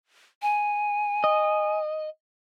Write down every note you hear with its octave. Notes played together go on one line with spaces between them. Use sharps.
G#5
D#5